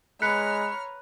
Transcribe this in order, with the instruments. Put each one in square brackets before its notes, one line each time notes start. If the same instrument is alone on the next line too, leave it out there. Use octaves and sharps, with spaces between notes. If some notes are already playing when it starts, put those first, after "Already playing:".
[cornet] G#3 [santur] B4 [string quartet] C#5 A#5 F6 [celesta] F#6 B6 C#7